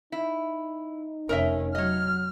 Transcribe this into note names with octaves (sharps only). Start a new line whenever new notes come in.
D#4 E4
F1 C#4 A#4 D#5 E5
F#3 C#5 D#5 F6